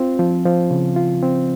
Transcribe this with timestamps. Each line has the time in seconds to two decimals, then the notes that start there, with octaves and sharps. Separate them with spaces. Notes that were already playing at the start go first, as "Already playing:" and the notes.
Already playing: C4 F4
0.19 F3
0.45 F3
0.71 C#3
0.96 F4
1.22 C4